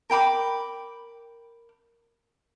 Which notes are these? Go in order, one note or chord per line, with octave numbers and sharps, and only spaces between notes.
A#4 G5 B5 D6